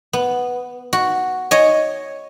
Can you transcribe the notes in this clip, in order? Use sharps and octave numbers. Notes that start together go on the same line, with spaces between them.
B3
F#4
C#5 D#5 G#5